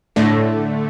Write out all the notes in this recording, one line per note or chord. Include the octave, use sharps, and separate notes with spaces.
A2 D3 A3